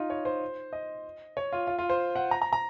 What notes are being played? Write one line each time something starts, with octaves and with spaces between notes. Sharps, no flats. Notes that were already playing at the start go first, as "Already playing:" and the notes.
Already playing: D#4 F4
C#5
C5
D#5
C#5
F4
F4
F4
C5
F#5
A#5
A#5
A#5